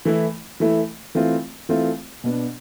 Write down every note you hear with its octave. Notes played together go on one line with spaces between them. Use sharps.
E3 A3 E4
E3 A3 E4
E3 A3 C4 F4
E3 A3 C4 F4
B2 B3 D4